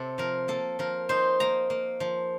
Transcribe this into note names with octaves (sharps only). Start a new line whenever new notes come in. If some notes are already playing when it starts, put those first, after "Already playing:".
Already playing: C3 A4
F3 A#4
A#3 A4
F3 A#4
D#4 C5
A#3 A#5
A#3
F3